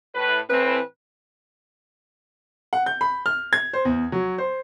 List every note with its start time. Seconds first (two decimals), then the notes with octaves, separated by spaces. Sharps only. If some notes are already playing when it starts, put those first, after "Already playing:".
0.15 A2 B4
0.50 A2 E3 C4 B4
2.73 F#5
2.86 G6
3.01 B5
3.26 F6
3.53 G#6
3.73 C5
3.85 E2
4.12 F#3
4.38 C5